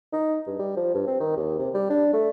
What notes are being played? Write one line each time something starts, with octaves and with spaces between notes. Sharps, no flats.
D#4
G2
G3
F3
G2
C4
D#3
D#2
C3
G3
D4
A3